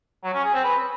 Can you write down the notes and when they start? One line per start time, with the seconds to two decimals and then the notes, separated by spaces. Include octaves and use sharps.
0.24 F#3
0.34 C#4
0.44 G#4
0.54 C4
0.64 B4